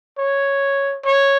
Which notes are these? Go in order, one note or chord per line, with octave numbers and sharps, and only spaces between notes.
C#5
C#5